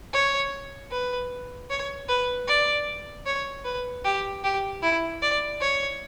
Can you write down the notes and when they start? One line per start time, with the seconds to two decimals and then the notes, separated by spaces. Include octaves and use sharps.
0.13 C#5
0.91 B4
1.70 C#5
2.09 B4
2.48 D5
3.26 C#5
3.65 B4
4.05 G4
4.44 G4
4.82 E4
5.22 D5
5.61 C#5